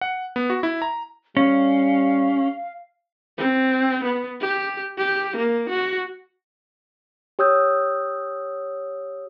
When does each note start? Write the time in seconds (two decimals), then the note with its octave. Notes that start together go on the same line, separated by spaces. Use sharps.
0.01 F#5
0.36 B3
0.50 F#4
0.63 E4
0.82 A#5
1.37 G3 C#4 F5
3.38 C4
4.04 B3
4.41 G4
4.98 G4
5.36 A#3
5.70 F#4
7.39 G4 C#5 D#6 E6 G6